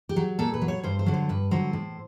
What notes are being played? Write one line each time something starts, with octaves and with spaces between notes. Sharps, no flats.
G4
F#3
A#2 A4
B4
F#3
C#5
G2 C5
C5
D3 F#3
C5
G2 B4
D3 F#3 C5
A2